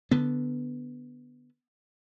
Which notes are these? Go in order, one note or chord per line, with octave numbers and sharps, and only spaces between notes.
D3 B3